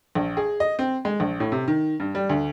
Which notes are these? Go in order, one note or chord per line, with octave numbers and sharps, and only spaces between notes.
A#1
G#4
D#5
C4
G#3
A#1
A2
C3
D#3
G2
G3
D2